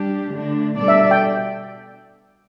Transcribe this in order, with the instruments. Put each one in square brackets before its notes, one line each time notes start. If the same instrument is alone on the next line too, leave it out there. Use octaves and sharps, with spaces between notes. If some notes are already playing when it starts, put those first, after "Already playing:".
Already playing: [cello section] G3 D4 G4
D3 A3 D4
B2 G3 D4 A4 D5
[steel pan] E5
E5
G5